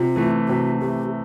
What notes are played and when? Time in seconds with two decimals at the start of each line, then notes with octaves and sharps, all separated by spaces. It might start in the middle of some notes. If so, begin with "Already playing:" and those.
Already playing: C3 F4
0.16 E3 A3
0.48 C3 F#4
0.81 E3 A3 G4